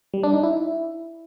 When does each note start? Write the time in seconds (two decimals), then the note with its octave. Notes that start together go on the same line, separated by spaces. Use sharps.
0.14 G3
0.23 D4
0.33 D#4
0.43 E4